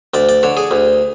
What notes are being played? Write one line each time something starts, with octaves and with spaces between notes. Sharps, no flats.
D2 D5
D5
D3 C#5
G#4
D2